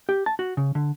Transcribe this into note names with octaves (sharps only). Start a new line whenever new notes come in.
G4
A5
F#4
C#3
D3